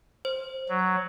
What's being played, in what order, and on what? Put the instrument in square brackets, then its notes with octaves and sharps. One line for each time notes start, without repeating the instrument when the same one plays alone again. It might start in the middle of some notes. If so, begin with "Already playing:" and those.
[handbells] C5
[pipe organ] F#3